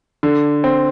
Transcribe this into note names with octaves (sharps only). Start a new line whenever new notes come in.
D3
C4